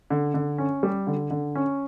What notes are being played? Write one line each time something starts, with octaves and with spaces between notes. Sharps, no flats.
D3
D3
C#4
G3
D3
D3
C#4